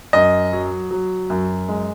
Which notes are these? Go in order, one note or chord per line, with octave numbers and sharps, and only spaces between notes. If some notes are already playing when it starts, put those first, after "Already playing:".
F#2 D#5
F#3
F#3
F#2
G#3